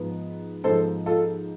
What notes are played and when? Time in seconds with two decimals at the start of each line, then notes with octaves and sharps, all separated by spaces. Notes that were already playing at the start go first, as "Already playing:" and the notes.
Already playing: G#2 F3 B3
0.64 G#2 F3 B3 A4 C5
1.06 F4 A4